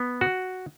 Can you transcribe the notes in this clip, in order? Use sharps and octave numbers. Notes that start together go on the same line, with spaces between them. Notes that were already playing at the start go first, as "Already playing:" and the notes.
Already playing: B3
F#4